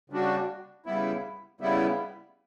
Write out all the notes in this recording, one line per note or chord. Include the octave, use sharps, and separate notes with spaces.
C#3 G3 D4 F#4
C#3 G3 B3 E4
C#3 G3 B3 E4